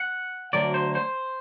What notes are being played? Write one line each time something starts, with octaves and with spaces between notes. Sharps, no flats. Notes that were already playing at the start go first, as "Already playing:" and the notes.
Already playing: F#5
D2 D3 F#3 D5
C5
C5